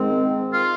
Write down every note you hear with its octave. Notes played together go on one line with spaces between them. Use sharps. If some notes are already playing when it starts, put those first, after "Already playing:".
Already playing: G#2 D#3 G#3 C4
F4